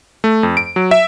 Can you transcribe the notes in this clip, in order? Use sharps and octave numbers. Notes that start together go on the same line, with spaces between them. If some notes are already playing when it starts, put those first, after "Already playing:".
A3
F2
D7
F#3
E5